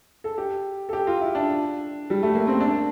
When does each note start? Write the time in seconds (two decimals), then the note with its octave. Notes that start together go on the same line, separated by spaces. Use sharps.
0.24 A4
0.38 G4
0.89 A4
0.93 G4
1.07 F4
1.21 E4
1.35 D4
2.10 G3
2.23 A3
2.35 A#3
2.47 C4
2.60 D4